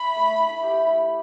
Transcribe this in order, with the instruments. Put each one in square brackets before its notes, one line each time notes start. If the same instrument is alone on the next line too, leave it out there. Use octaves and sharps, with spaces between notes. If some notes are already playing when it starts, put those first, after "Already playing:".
Already playing: [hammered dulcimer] E5 [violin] B5
[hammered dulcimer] A3
E4
G4
E4